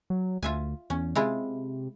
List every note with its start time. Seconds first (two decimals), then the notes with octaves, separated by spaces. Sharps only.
0.10 F#3
0.43 D2 F4 E5 G#5
0.90 E2 C#4
1.15 C3 G#3 E4 F4